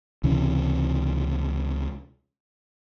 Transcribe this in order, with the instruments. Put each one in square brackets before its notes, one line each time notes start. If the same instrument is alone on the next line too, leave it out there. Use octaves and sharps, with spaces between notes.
[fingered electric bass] C#2 C3 E3 C#4